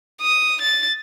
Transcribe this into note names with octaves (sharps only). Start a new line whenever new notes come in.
D#6
A6